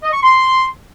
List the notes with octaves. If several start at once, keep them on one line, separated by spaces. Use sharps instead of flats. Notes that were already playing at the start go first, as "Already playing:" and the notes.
D#5
C#6
C6